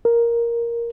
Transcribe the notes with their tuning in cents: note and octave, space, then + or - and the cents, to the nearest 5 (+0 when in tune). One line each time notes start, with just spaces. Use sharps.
A#4 +5